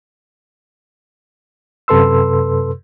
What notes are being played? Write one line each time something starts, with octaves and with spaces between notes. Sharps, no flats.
F#2 C3 A4 B4 C6 E6